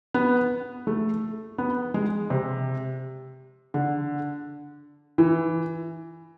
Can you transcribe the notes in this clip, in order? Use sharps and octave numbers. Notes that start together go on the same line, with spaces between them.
B3
A3
B3
G#3
C3
D3
E3